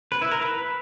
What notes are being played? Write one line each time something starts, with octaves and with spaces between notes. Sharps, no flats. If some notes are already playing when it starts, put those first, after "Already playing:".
B4
E4
A#4
B4